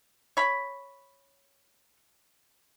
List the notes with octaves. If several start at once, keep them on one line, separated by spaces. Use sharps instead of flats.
C#5 B5